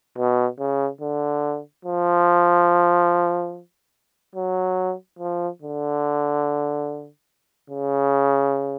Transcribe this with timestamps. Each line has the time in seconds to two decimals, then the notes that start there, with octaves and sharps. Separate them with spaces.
0.18 B2
0.59 C#3
1.01 D3
1.85 F3
4.35 F#3
5.19 F3
5.62 D3
7.70 C#3